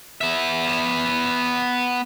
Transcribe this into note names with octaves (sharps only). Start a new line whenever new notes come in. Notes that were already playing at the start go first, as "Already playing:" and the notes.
B3 E5